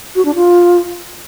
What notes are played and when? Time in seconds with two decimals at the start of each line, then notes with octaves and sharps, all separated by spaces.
0.15 F#4
0.25 D4
0.35 F4